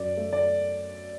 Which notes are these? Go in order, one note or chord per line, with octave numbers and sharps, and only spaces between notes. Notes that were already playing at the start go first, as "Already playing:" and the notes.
Already playing: F#2 D5
A3
D5